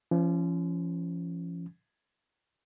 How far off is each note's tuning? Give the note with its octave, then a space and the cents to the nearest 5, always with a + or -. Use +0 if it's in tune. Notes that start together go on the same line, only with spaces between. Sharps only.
F3 -35 C#4 +0